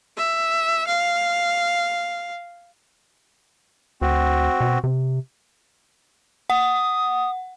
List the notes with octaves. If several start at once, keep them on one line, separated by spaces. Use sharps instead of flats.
E5
F5
D2 C4 F#4
B2
C3
F#5 D#6